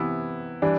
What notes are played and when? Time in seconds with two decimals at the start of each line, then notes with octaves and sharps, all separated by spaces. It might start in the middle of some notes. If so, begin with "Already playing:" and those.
Already playing: C3 E3 B3 E4
0.62 E3 G3 D4